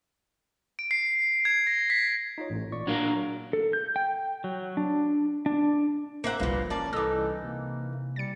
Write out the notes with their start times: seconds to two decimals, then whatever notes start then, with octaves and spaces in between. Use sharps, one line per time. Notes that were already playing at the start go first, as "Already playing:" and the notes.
0.79 D7
0.91 C7
1.45 G#6
1.67 A#6
1.90 B6
2.38 D#4 F4 C#5
2.50 A1 A2
2.72 A#2 D5 C#6
2.87 F#3 A#3 D4
3.53 A4
3.73 G6
3.96 G5
4.44 F#3
4.77 D4
5.46 D4
6.24 A1 A#3 C5 E5 F#5 C7
6.40 G1 C2 A#2 F3 A#3 B4
6.70 A#3 C#4 D5 A5
6.93 C2 E3 D#4 A4 D6 E6
7.43 C3 A#3
8.16 G3 A6 C#7